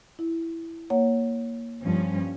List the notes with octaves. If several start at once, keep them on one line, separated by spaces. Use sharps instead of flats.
E4
A#3 C#5 F#5
G2 F3 C#4